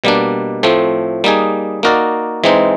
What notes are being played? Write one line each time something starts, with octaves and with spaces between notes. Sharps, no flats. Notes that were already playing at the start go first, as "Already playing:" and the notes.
B2 G3 A#3 D4
A2 F3 A3 C4
G3 A#3 D#4 G#4
A#3 D#4 F#4 A#4 D5
E3 G#3 C4 D#4